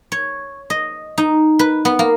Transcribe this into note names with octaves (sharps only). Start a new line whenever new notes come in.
C#5
D#5
D#4
B4
B3
A#3